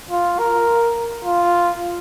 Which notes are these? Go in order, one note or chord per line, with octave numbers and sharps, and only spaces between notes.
F4
A#4
F4